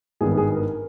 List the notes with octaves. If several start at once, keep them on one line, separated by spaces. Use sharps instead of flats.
G#1 G2 D#3 G3 B3 G#4
G#4
A#4